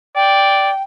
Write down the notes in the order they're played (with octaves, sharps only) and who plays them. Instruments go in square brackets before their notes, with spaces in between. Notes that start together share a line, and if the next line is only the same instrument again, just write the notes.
[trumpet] D5 [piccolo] G5